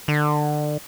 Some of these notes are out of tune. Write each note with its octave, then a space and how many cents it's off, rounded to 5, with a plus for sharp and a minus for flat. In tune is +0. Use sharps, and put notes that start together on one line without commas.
D3 +30